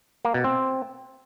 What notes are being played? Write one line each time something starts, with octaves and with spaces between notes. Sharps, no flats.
A#3
B2
C4